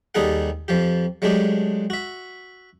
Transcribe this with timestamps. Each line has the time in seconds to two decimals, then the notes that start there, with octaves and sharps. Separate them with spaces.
0.15 D#2 G3 D#4 G#4 A4 F#5
0.68 F2 F3 G4
1.22 F#3 G#3 A3 D4 G4
1.90 F#4 E5